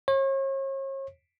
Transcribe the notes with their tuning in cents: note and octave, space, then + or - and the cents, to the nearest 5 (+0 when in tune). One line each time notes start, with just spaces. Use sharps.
C#5 -40